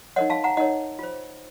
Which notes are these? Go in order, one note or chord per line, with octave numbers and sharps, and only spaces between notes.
D#4 A#4 C#5 D#5 F#5
F5 A5
F#5 A#5
D#4 A#4 C#5 D#5 F#5
F4 C5